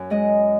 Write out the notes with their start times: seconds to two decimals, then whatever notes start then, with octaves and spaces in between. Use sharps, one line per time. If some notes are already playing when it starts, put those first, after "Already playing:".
Already playing: F#2
0.10 G#3 D#5